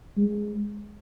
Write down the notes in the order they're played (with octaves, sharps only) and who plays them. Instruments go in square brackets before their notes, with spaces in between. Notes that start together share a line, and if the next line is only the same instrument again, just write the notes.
[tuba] G#3